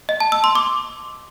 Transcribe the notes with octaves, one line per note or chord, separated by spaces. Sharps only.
D#5
A5
E6
C6
D6